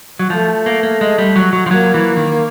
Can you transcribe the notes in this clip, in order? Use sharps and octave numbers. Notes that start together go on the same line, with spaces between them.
F#3
F3 A3
A#3
A#3
G#3
G3
F#3
F#3
F3
F#3 A#3
E3
D#3